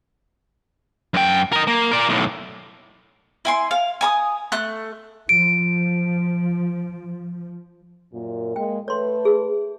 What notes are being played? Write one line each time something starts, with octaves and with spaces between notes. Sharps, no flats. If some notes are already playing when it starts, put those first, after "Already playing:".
F#2 G5
A#4 D#5
A#3
A#4 D5
B1 A2
E4 G#5 C6
F5
G#5 A#5 D#6
A3 F#6
F3 D7
F#2 A#2
G#3 A#3 G5
A3 A4 B4 C#5 C6
G#4